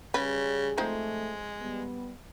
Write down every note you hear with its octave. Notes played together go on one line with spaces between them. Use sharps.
C#3 G3 C#4 G#4 B4
F3 G#3 A3 C4 D#4
G3 B3